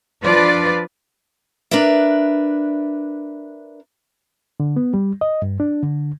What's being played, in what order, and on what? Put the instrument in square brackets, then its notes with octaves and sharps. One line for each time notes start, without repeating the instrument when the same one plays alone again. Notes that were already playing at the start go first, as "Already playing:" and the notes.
[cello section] F3 D4 F4 B4 D5
[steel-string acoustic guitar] D4 A#4 B4 D5 E5
[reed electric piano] D3
B3
G3
D#5
G2
D4
D3